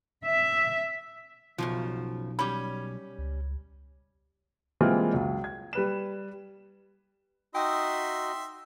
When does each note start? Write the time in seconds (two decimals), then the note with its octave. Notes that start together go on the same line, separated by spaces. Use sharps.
0.24 E5
1.58 B1 F#2 C#3 F3
2.39 G3 C#4 B5
3.18 C#2
4.81 E3 G3 G#3 A#3 C4 F4
5.13 C#2 F#2
5.44 G#6
5.73 G3 B4 E7
7.55 D#4 F#4 D#5 E5 G5 C6 D#6